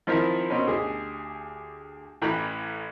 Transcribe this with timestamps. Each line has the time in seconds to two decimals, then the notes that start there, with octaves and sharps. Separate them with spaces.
0.07 D#3 F3 C4 E4 F4 A#4
0.50 B2 C4 C#4 A#4
0.67 D2 G4 G#4
2.22 A1 E3 G5 A#5 B5 F#6